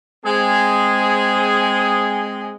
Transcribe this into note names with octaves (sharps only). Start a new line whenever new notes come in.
G#3 C4 G#4